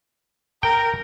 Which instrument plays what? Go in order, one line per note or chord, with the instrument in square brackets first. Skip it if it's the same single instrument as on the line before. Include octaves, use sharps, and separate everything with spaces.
[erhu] A#4 [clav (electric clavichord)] G5